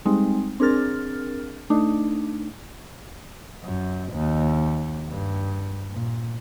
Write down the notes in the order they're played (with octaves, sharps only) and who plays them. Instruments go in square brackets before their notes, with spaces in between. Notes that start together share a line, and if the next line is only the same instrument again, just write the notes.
[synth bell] G3 G#3 C4 D#4
C4 D4 G#4 A#4 F6 A6
A3 D4 D#4
[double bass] F#2
D#2
G2
A#2